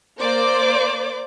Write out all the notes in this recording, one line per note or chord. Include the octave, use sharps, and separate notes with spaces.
A#3 C5 D5 D6